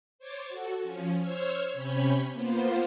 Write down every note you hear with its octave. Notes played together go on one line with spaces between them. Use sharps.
C5 C#5 D6 G#6 A6
F#4 A4
F3 C#4
C5 C#5 E6 F6 G#6
C3 C#4 C#5 B5 G6
A#3 B3 F4 C5